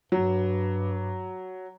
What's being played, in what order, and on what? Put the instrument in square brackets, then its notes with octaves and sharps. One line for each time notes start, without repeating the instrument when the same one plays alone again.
[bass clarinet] G2 [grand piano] F#3